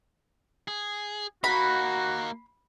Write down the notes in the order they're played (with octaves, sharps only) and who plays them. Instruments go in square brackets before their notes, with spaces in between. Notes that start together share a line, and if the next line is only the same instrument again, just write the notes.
[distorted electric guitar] G#4
[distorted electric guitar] A#3 D#4 [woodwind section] F#4 [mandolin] B5